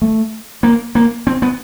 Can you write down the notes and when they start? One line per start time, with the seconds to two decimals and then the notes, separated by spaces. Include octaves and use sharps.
0.02 A3
0.63 A#3
0.95 A#3
1.27 C4
1.42 B3